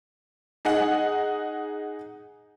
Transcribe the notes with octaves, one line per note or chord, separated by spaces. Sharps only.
D#4 G#4 D#5 F#5